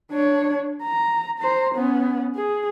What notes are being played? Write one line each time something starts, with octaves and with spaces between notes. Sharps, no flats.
D4 C#5
A#5
C5 A#5
B3 C#4
G#4